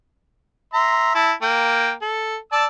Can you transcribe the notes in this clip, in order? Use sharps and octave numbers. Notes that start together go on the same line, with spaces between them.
E5 A#5 C6
E4 A5
A#3 G5
A4
D5 A5 E6